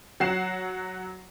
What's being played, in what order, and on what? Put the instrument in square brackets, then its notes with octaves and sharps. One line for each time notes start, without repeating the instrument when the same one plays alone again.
[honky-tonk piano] F#3 F#5 C7 E7